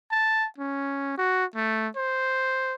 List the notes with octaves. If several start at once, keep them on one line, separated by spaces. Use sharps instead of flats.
A5
C#4
F#4
A3
C5